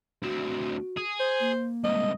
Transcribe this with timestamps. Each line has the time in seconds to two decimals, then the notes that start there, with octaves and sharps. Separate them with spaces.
0.23 D2 C4 F#4
0.97 G#4
1.20 C5
1.40 A#3
1.84 C2 G#2 D#5